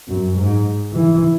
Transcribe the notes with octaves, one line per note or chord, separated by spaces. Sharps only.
F#2
G#2
E3